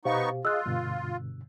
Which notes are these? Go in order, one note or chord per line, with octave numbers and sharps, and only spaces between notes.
B2 B3 D#4 G4 C5 F5 C#6
F4 G#4 D#5 D#6 E6 F#6
G2 B2 D3